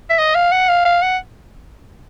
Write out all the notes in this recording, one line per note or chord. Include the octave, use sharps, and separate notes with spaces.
E5
D#5
F5
F#5
F5
F5
F#5